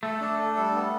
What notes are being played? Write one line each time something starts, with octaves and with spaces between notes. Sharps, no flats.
A3 A4
D4
A4
G3
B3